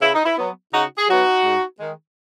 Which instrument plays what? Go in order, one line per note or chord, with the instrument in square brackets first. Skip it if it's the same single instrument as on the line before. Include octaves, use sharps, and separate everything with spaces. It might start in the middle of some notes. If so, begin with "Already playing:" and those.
[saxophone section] C#3 E4
D#4
E4
F#3 B3
C#3 D#4 F#4
G#4
F#3 B3 D#4 F#4
G#2
D#3 G#3